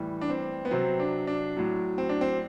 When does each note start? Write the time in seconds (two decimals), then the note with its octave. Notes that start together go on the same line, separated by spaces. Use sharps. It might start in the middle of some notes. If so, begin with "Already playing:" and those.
Already playing: A2 E3 G3
0.21 D4
0.30 C4
0.65 B3
0.71 C3 F#3 C4
1.00 D4
1.27 D4
1.57 A2 F#3
1.98 C4
2.09 D4
2.21 C4